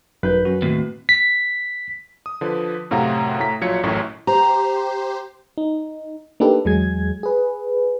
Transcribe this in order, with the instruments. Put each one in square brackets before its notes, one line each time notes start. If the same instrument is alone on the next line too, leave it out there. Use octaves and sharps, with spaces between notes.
[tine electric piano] G#1 D#4 G6 [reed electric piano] F#2 [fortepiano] B4
[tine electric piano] F#3 C#4 F#4
[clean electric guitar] D#2 A2 [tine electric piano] C4 F#4
[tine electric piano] B6
[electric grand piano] D#6
D3 F3 B4
F#2 A2 C3 F5 F#5 A#5
A2 A#5 B6
A#1 F#3 F4 G#6 C#7
A1 F#2 A2 F#3 C#6
[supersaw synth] G4 C5 [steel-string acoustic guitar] A#5
[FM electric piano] D#4
A#3 D4 D#4 G4 A4 B4
E2 F#3 G#3 G#4 G#6
G#4 B4